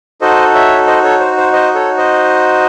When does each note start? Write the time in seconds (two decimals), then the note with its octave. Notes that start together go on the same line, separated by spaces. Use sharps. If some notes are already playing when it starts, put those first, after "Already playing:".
0.21 D#4 F#4 A4 C5 D#5
0.54 C#5 E5
0.87 C5 D#5
1.04 A4 C#5
1.20 C5
1.37 C5
1.53 C5 D#5
1.74 A4 C#5
1.97 C5 D#5